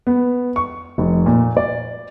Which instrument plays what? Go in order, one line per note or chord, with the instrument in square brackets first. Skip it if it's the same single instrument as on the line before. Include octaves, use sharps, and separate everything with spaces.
[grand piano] B3
C#6
F1
A#2
D5